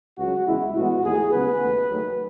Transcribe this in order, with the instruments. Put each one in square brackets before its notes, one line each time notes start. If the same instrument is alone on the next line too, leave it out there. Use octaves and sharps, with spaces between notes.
[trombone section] C#2 C#3 F#3 F#4
E2 C#3 G#3 E4
A2 E3 G#3 B3 F#4
D#2 D#3 A3 G#4
C#2 C#3 F#3 B3 B4
D#2 D#3 A3
D#2 D#3 F#3 A3